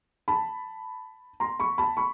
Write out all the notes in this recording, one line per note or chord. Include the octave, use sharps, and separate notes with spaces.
A5 B5
A#5 C6
B5 C#6
A5 B5
B5 C#6